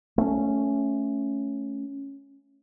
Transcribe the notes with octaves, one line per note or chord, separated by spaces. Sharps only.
A3 C4 C#4